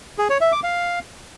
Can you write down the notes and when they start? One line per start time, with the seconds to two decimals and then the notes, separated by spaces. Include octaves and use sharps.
0.18 G#4
0.30 C#5
0.41 E5
0.52 D6
0.63 F5